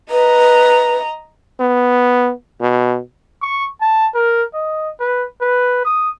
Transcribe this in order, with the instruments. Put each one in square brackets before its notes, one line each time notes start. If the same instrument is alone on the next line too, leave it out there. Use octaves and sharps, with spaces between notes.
[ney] B4 [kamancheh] D#5 A#5
[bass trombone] B3
B2
[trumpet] C#6
A5
A#4
D#5
B4
B4
D#6